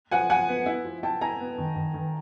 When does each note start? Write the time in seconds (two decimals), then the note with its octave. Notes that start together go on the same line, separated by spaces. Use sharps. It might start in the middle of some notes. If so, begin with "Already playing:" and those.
0.11 F3 F#5 G#5
0.30 F3 F#5 G#5
0.49 B3
0.66 E4
0.85 F3
1.03 E4 G5 A5
1.21 E4 G#5 A#5
1.40 B3
1.58 D#3
1.76 D#3
1.94 D#3